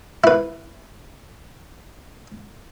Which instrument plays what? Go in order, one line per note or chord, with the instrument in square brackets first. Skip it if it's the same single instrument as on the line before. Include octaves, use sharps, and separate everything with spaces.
[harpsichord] E4 B4